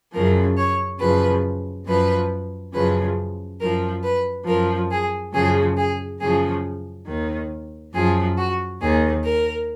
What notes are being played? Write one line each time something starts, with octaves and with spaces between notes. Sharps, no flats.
F#2 C#3 F3 A#4
C#5
F#2 C#3 F3 B4
F#2 F3 B4
F#2 C#3 F3 B4
F#2 F3 A#4
B4
F#2 F3 A#4
G#4
F#2 C#3 F3 G#4
G#4
F#2 C#3 F3 G#4
D#2 D#3
F#2 F3 G#4
F#4
D#2 D#3 G#4
A#4